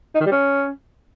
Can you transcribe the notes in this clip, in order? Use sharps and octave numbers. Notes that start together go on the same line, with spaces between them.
D#4
D#3
G3
C#4